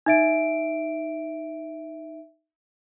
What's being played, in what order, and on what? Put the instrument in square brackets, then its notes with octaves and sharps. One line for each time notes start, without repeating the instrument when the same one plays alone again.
[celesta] D#4 E5 D7